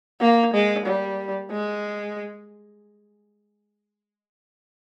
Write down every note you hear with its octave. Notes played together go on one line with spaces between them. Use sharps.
A#3
G#3
G3
G#3